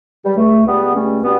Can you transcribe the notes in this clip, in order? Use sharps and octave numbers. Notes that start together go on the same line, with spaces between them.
G3
C#2 A3
C#2 G3 B3
G3 A3 C#4
B2 G3 B3